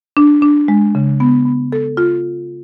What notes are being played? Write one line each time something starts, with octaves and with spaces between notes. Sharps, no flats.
D4
D4
G#3
C#3
B3
B3
A4
F4